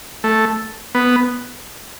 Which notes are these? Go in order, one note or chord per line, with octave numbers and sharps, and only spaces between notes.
A3
B3